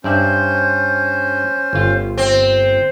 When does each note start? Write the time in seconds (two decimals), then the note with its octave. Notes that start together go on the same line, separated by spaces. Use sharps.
0.04 G2 C#4 C5 D5 E5
1.73 G1 F4
2.18 C4